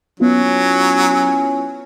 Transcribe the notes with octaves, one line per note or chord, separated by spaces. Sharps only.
F#3 B3 C#4 E4 F4